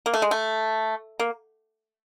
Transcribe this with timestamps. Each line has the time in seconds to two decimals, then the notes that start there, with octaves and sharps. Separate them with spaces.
0.06 A#3
0.14 A3
0.22 G#3
0.31 A3
1.20 A#3